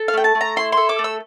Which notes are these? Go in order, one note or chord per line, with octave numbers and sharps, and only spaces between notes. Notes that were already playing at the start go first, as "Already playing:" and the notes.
Already playing: A4
F5
A3 G5
A5
A3
A#5
E4 C6
A4 C6
D6
A3
E6